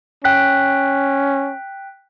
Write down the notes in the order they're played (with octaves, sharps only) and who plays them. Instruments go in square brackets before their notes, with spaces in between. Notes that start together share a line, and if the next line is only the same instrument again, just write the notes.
[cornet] C#4 [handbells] G5 F#6 B6